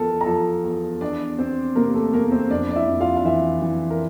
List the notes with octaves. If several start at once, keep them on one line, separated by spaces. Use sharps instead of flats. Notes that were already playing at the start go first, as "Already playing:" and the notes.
Already playing: E2 F3 A4 A#4 A5
A#5
F3 A4 A5
E2
E2 D4 D5
E2 C4 C5
C3 A#3 A#4
A3 A4
E2 A#3 A#4
C4 C5
F2 D4 D5
D5
E4 E5
F2
F4 F5
F5
E3 E4 E5
E3
A#4